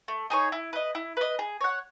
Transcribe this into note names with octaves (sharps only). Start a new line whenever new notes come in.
A3
D#4 G#4 C#5
E4
B4 D#5
E4
B4 D#5
G#4
C#5 F#5